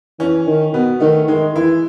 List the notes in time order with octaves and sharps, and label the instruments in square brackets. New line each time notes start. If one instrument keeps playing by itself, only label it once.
[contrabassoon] E3 [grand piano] C#4
[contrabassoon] D#3
[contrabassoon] B2 [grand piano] B3
[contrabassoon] D#3 [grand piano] A3
[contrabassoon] D#3 [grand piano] G#3
[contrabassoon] E3 [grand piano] E4